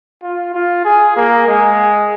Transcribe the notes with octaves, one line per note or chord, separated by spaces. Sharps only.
F4
F4
G#4
A#3
G#3